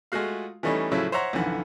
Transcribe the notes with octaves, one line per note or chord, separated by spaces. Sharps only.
G#3 A3 F4 F#4 F5
E3 G3 A3 C#4 D#4
A2 C#3 F3 F#3 A3 E4
C5 C#5 E5 F#5 A#5
B1 F2 D3 E3 F#5